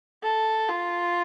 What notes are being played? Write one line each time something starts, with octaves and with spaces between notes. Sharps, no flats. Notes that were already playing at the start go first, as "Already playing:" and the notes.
A4
F4